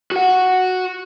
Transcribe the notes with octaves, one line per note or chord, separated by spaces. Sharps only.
F#4 F#5